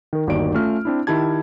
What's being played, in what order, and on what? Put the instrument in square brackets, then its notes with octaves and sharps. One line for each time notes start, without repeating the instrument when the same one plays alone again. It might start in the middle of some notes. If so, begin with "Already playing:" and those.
[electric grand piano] D#3 A#4
G1 D#2 D#3 F#4 D5 D7
A3 C#4 F4 F6
C4 D4 E4
D#3 E4 G4 A5 G#6